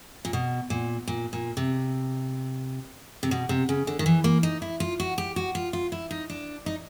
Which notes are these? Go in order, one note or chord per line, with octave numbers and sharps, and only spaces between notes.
A#2
B2
A#2
A#2
A#2
C3
C3
B2
C3
C#3
D3
D#3
E3
A#3
D#4
E4
F4
F#4
G4
F#4
F4
F4
E4
D#4
D4
D#4